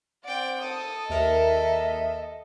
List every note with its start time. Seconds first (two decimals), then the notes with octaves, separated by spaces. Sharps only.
0.24 C4 D5 F#5 G5
0.62 A4 D#6
1.10 D#2 A#4 D#5 E5